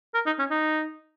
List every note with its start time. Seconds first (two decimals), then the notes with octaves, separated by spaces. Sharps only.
0.14 A#4
0.26 D#4
0.39 C#4
0.50 D#4